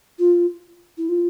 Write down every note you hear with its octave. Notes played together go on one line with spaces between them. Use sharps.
F4
E4
F4